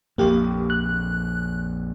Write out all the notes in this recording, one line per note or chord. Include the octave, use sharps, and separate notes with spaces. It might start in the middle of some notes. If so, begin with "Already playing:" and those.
A#1 F2 A#3 G4
F#6